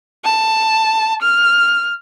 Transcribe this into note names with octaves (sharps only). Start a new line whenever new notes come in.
A5
F6